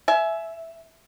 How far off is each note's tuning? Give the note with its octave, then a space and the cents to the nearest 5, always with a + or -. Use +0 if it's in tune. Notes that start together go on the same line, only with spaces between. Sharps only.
E5 +0 G#5 +25